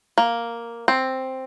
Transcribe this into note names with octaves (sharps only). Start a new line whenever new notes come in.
A#3
C4